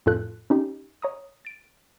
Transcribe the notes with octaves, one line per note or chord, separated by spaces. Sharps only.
F2 A2 F4 A4 F#6
C#4 D#4 G4
C#5 A#5 D#6
A6 D7